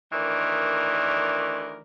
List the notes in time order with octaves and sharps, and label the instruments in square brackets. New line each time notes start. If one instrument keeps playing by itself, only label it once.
[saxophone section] D2 D#3 E3 A#4 D5